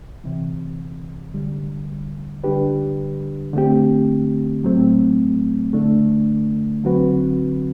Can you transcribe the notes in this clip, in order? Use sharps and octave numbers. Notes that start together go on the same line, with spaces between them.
D2 C3 E3
D2 D3 G3
D3 G3 D4 G4 B4
D3 A3 C4 G4
A2 F#3 A3 C4
D3 A3 D4
D3 F#3 C4 F#4 B4